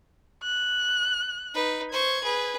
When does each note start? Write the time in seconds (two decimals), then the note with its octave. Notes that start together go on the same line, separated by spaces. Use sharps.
0.43 F#6
1.54 D#4 B4
1.92 C5 C#6 G#6
2.23 G#4 B4